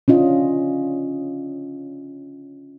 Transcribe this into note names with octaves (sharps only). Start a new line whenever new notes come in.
C#4 D4 F4 D#5